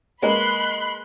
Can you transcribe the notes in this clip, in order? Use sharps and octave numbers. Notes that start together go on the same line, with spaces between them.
G#3 A#3 B4 B5 C6 F#6